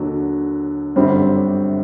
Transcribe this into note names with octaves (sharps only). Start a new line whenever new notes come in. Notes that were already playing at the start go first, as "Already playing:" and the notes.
Already playing: D#2 D3 F#3
G1 F#2 D3 G3 C4